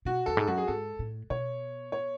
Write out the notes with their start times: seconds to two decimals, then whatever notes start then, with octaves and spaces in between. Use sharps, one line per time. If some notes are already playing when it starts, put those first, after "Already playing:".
0.05 B2 F#4
0.26 E2 A4
0.37 G#2
0.47 F#2 F#4
0.58 G#4
0.68 G#2 A4
0.99 A2
1.30 B2 C#5
1.92 C#5